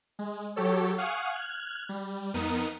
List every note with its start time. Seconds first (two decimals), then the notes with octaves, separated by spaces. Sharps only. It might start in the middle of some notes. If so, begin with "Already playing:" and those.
0.19 G#3
0.56 F#3 G4 A4 C#5
0.98 F5 F#5 G#5 C#6 D#6 F6
1.32 F6 F#6 G#6
1.89 G3
2.34 F2 B3 D#4 A#4 D#6